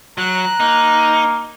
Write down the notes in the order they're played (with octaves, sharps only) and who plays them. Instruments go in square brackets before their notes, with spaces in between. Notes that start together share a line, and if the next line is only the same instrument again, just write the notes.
[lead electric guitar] F#3 [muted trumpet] A#5 [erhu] F#6
[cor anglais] A#3 [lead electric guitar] D#4